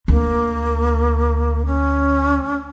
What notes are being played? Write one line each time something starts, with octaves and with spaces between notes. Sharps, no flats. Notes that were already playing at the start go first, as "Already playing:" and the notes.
D2 A#3
C#4